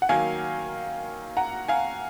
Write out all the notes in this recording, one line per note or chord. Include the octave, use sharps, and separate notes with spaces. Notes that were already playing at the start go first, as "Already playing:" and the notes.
F#5
D#3 F#3 A#3 F5 G#5
F#5 A#5
F5 G#5